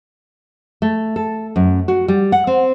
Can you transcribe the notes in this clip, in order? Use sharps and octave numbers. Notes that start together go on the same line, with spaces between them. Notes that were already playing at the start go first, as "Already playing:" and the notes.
A3
A4
F#2
F#4
G3
F#5
C4